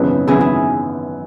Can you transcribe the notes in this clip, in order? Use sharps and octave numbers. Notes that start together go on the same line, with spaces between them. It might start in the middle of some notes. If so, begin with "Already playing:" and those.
Already playing: G#1 F#2 C#3 E3 B3 G#4 B4 C#5
G#1 F#2 C#3 E3 B3 E4 G#4
E4